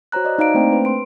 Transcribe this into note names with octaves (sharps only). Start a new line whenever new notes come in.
F#4 C5 C#5 A#5 F#6
D5 D#5
D#4 D5 F5 A#5 D7
A3 A#3 C4 D4 C5 G5
B4
C6 D7